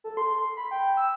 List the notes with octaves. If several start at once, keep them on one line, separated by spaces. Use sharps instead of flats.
A4
C6
B5
G5
E6